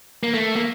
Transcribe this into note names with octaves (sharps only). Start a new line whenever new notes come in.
A#3
A3
A#3